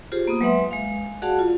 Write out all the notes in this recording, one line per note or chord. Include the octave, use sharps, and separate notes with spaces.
F4 G4 G#4 C5
A#3 B3 D#6
F#3 G#3 B4 E5 F#5 C6
G#3 F5
F#4 G#4 D5 F5 F#5 A5
F4